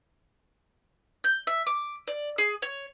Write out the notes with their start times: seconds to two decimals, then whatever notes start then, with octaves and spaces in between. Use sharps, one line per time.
1.24 G6
1.47 E5
1.67 D6
2.08 D5
2.38 G#4
2.62 C#5